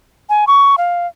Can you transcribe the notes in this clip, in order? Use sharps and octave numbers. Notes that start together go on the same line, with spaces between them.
G#5
C#6
F5